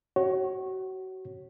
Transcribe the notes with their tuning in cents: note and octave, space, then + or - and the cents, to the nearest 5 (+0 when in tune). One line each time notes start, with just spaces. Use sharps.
F#4 +30 C#5 -20